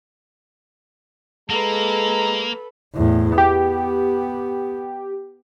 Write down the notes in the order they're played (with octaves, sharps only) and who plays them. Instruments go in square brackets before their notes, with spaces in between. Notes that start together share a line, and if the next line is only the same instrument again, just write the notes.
[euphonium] G#3 [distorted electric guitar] A#3 [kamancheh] A4 B4 [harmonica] A#5
[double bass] E2 A2
[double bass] B3 [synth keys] G4